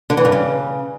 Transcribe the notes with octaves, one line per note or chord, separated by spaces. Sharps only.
D3
E3
G2
C#3